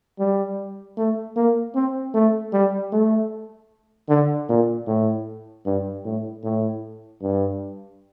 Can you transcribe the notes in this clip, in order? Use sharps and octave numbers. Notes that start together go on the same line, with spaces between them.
G3
A3
A#3
C4
A3
G3
A3
D3
A#2
A2
G2
A2
A2
G2